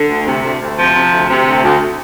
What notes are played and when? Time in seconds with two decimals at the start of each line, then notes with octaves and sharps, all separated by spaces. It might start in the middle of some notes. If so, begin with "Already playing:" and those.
Already playing: D3
0.10 D2
0.27 C3
0.44 D2
0.61 D2
0.78 C3 F3
0.95 C3
1.12 D2
1.29 C3
1.47 D2
1.64 D2